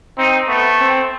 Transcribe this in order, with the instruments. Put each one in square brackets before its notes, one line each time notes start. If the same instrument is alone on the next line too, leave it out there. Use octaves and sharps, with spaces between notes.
[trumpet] C4 [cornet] D#4
[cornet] A3 [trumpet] B3
[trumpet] C4